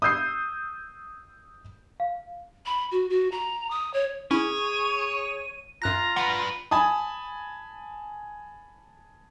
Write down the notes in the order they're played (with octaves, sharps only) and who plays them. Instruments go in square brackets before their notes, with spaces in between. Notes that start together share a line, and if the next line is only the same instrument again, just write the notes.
[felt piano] D#6 E6 G6 C7
[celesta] F5
[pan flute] B5
F#4
F#4
A#5
D#6
C#5
[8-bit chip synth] C#4 E4 [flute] G#4 [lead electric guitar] C#5 [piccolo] D#7
[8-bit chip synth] F#2 F#6 A#6 [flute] F4 [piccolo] A#5
[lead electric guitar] G3 B4 [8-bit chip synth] F#5
[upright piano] G#5 A5 B5 D#6